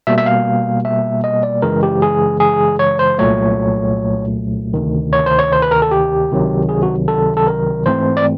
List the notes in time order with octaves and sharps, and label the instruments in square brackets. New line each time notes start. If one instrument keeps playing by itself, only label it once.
[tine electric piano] B2 G3 A#3 E5
E5
F5
E5
D#5
D5
F#2 C#3 E3 G#3 A#4
G4
G#4
G#4
C#5
C5
C2 A#2 F#3 A3 C#5
D2 C3 D#3
C#5
C5
C#5
C5
B4
A#4
A4
G4
C#2 C3 D#3 F#3
G#4
F#4
A4
A4
A#4
G#2 E3 A3 C4 C5
D5